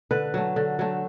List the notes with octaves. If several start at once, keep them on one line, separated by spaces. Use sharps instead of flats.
D3 B4
F#3 A3
D3
F#3 A3